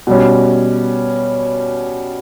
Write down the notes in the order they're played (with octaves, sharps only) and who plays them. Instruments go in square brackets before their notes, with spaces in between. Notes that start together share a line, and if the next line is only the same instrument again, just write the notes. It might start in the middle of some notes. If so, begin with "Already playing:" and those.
[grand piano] B2 G3 C#4